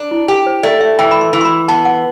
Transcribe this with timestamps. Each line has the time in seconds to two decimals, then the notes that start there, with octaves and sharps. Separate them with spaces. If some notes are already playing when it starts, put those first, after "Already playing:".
Already playing: D4
0.11 E4
0.28 G4
0.46 C5
0.63 A3 D5
0.81 E5
0.99 E3 G5
1.11 B5
1.21 C6
1.33 E3
1.41 C6
1.45 B5
1.68 B3 A5
1.85 F#5